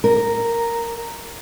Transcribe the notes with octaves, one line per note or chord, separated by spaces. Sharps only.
A#4